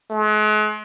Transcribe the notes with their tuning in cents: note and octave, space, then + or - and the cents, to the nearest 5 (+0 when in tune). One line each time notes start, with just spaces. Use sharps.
G#3 +40